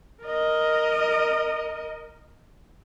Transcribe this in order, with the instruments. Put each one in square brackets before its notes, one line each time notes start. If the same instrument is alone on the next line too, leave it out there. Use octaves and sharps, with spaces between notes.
[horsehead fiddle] A#4 D#5